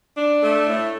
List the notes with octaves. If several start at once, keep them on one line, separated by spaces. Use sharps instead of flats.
D4
A3
A2